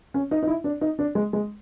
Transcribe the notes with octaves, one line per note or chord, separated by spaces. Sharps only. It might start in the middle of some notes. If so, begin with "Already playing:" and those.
C#4
D#4
D#4
E4
D4
D#4
D4
G#3
G#3